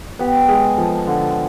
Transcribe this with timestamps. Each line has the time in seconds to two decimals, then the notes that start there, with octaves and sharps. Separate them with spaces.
0.19 B3 G4
0.48 G#3 G#4
0.78 F3 A4
1.07 D3